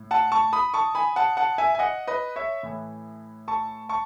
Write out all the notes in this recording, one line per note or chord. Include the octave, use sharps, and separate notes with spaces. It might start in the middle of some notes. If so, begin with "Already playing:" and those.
Already playing: A2
F#5 A5
A5 C#6
B5 D#6
A5 C#6
G#5 B5
F#5 A5
F#5 A5
E5 G#5
G#5
D#5 F#5
B4 D#5
C#5 E5
A2 E3
A5 C#6
A5 C#6